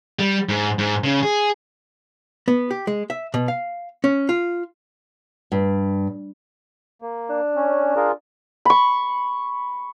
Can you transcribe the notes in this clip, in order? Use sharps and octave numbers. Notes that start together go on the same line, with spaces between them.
G3
G#2
G#2
C#3
G#4
B3
G4
G#3
E5
B2
F5
C#4
F4
G2
A#3
D4
C#4
F4 G#4 A#4
B5 C#6